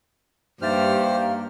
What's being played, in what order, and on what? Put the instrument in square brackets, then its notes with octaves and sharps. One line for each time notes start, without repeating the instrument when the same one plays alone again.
[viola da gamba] G2 [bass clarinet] A#3 [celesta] D#4 E5 A6 [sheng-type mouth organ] G4 C5 F6